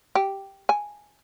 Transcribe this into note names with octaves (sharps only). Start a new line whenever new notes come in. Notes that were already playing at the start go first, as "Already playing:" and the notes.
G4
G#5